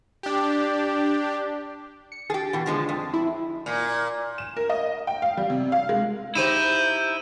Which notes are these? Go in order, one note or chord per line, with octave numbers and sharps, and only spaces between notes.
D4 G4
C#7
G4 G#4 A6
B2 E3
D3 F3 G#3
F2
E4
A#2
E7
A#4
D#5
G5
F5
G3
C3
F5
G#3
D#4 E4 G4 C5 G6 D#7 E7